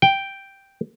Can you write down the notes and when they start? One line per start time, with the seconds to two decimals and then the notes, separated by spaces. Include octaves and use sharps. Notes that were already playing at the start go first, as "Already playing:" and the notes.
0.02 G5